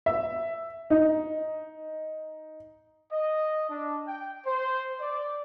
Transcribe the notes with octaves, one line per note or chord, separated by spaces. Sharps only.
E5
D#4
D#5
D4
G5
C5
D5